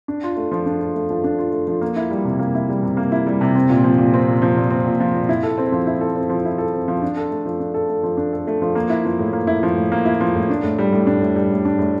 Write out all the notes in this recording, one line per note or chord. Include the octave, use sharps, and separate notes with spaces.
D4
F4
A3
F3
D4
F4
A3
F3
D4
F4
A3
F3
A#3
E4
G3
C3
A#3
E4
G3
C3
A#3
E4
G3
C3
C4
A#2
F3
A#2
C4
A#2
F3
A#2
C4
A#2
F3
A#2
E4
A4
C4
F3
E4
A4
C4
F3
E4
A4
C4
F3
D4
A4
A3
F3
D4
A4
A3
F3
D4
A4
A3
F3
A#3
E4
F3
A2
A#3
E4
F3
A2
A#3
E4
F3
A2
D4
A2
G3
A2
D4
A2
G3
A2
D4
A2